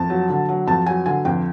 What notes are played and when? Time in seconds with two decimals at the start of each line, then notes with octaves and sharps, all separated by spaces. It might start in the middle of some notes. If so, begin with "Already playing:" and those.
Already playing: F2 A5
0.10 F#3
0.29 D3
0.49 F#3
0.67 F2 A5
0.86 F#3 G#5
1.06 D3 G#5
1.25 F2 G5